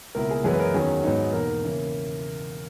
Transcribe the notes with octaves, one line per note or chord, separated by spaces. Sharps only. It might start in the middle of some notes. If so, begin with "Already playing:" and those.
C#2 B2 A#3 E4 A#4
G#4
F#2 E3 G#3 B3 G#4
B4
A#4
E2 D#3 F#3 C#4 G#4
G#2 F#3 B3 D#4
E2 B2 A#3 D#4 A#4
C#3 E3 A#3